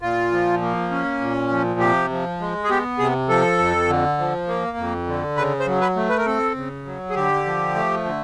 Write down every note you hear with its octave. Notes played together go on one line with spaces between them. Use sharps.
A#2 F4
F3
A#3
C#4
A#2
F3
C3 G4
F3
G#3
G#4
B3 G4
C3 G#4
F3 A4
F2
D3
F3
A#3
F2
D3
C#3 B4
C5
F#3
B4
A3
B4
A#4
C4 A4
C#3
F#3
G#4
D3 G4
F3
A3
D3